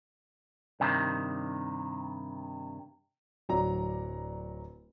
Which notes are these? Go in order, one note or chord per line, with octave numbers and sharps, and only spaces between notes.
G2 C3 D#3
D1 F#3 D5 A#5